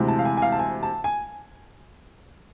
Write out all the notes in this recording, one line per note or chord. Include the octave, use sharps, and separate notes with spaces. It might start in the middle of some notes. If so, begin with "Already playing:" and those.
Already playing: D2 C3 E3 G#3
A5
F5
G#5
G#5
F5
A5
G#5
A5
G#5